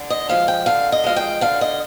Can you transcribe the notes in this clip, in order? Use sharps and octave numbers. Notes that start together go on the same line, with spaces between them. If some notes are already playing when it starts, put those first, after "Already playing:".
Already playing: D3
D#5
F3 G#3 F5
G5
D3 F5
D#5
F3 G#3 F5
G5
D3 F5
D#5